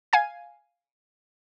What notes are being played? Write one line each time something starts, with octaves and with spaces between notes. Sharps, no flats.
F5 G#5 G#6